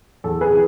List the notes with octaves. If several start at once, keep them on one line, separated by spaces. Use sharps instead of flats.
E2 A4
G#4 B4
C3 E3